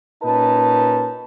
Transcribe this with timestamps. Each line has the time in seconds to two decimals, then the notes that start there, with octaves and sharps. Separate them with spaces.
0.23 A#2 C#4 D#4 B4 A5